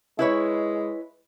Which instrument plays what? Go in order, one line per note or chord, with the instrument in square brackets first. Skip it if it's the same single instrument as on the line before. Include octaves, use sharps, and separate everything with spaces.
[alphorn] G#3 [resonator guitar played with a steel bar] E4 B4 C#5